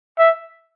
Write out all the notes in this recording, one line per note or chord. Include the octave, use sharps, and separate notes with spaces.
E5